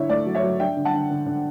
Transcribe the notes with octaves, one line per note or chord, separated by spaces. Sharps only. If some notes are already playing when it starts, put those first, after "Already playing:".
Already playing: D3 E4 C#5 E5
A3 D5
F#3
C#5 E5
F#3
D4 E5 G5
D3
F#5 A5
D3
D3
D3